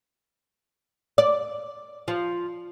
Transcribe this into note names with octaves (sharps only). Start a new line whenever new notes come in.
D5
F3